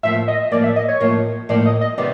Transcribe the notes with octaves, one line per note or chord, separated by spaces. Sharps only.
A2 F3 A#3 E5
D#5
A2 F3 A#3 D5
E5
D#5
C#5
A2 F3 A#3
A2 F3 A#3 D5
D#5
D#5
C3 D#3 G3 B3 D5